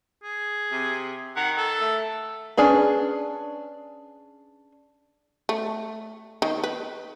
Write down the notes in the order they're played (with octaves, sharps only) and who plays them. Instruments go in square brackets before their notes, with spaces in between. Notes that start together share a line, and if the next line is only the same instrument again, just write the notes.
[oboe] G#4
[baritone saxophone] C3
[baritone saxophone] D#3 [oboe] F#5
[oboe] A4
[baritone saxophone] A3
[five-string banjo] C#4 D4 G#4 B4
[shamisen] A3
D#3
B4